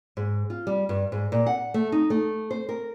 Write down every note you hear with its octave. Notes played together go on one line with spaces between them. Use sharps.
G#2
F4
G3
G2
G#2
A#2
F#5
A3
D#4
A3
C5
A#4